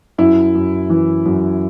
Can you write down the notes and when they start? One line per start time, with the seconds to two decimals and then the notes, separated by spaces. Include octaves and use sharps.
0.18 F#2 E4
0.55 F#2
0.90 E3
1.26 F#2